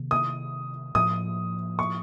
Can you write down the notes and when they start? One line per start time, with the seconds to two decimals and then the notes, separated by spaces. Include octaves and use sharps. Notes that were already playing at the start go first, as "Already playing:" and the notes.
Already playing: C3 D#3 A#3
0.11 D#6
0.95 A2 F3 A#3 D#6
1.79 C#6